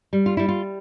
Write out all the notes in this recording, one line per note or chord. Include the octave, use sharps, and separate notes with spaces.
G3
F4
G3 E4
F4